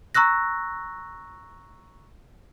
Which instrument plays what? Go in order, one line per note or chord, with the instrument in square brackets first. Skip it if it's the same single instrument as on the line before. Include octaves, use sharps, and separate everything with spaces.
[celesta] A#5 C#6 E6 F#6 A#6